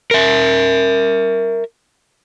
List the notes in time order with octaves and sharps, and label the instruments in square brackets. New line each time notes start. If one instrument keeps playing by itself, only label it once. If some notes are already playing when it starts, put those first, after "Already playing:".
[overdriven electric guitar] A#4 E5